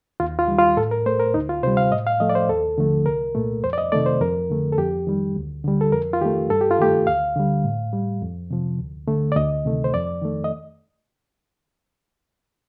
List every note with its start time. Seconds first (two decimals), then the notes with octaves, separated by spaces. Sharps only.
0.20 D#2 F4
0.39 F4
0.48 D#3 G3
0.58 F4
0.77 A2 A4
0.91 A#4
1.06 A3 C5
1.20 A#4
1.34 D2 D#4
1.49 F4
1.63 C3 C5
1.67 G3
1.77 F5
1.92 A2 D#5
2.07 F5
2.20 F3 A3 D#5
2.29 D5
2.35 C5
2.49 D#2 A4
2.78 D3 F3 A3
3.06 C2 A#4
3.35 A#2 A3
3.63 F2 C5
3.73 D5
3.78 D#5
3.92 C3 D#3 A3 D5
4.06 C5
4.21 F2 A#4
4.50 D3 A3
4.72 A4
4.78 F2 G4
5.07 D#3 G3
5.36 D2
5.64 D3 G3
5.81 A4
5.92 F2 A#4
6.13 F4
6.21 D#3 G4
6.26 A3
6.50 G2 A4
6.61 G4
6.71 F4
6.79 D#3 A3 G4
7.07 D2 F5
7.36 D3 G3
7.64 A2
7.93 G3
8.21 F2
8.51 C3 F3
8.79 D2
9.08 D3 A3
9.32 D5
9.36 D2 D#5
9.65 C3 D#3 A3
9.84 C5
9.93 F2 D5
10.22 D#3 A3
10.44 D#5